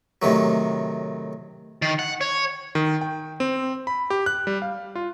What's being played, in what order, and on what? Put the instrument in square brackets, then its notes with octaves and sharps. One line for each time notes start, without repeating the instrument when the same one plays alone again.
[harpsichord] A2 C3 D#3 F#3
[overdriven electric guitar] D#3
F#5
C#5
[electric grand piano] D#3
G5
C4
B5
G4
F#6
G3
F5
F4